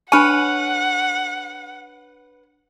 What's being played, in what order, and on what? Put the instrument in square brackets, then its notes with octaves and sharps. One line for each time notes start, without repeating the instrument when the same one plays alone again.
[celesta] D4 F6 D#7 [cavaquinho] B4 C#5 [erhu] F#5 [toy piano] G#5 C#6